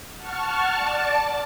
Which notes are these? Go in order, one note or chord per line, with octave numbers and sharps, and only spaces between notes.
F#5 A5 C#6 F6
D5 A5